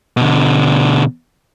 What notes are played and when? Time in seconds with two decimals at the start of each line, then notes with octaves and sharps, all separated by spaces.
0.17 B2 D3